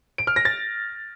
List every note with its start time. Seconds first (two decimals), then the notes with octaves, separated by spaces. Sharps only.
0.18 D7
0.27 F6
0.36 A#6
0.45 A6